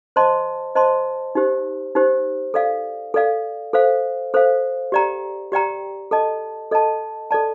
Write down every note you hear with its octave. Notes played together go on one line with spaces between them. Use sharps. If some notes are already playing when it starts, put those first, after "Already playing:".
C5 D#5 A5 C6
C5 D#5 A5 C6
D#4 G4 C5
D#4 G4 C5
A4 D5 F5
A4 D5 F5
A4 C5 F5
A4 C5 F5
G4 D5 G5 A#5
G4 D5 G5 A#5
A4 D#5 A5
A4 D#5 A5
A4 D5 A5